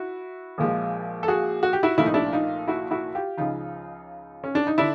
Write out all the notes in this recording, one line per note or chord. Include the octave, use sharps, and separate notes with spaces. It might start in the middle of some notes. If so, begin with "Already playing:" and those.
Already playing: E4 F#4
A#1 A#2 F3 G#3
A4
F#4 G#4
F#4
G4
E4 F#4
C2 A#2 F3 A3 E4
D#4
D4 E4
D#4 F4
E4 F#4
E4 F#4
F4 G4
C#2 C#3 F3 D#4 F4
C#4
D4
D#4
D3 D4 E4